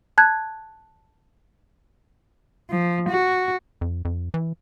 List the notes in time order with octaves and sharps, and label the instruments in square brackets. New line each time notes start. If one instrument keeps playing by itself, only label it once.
[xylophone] A5 F#6 G#6
[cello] F3
F#4
[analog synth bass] F2
F2
E3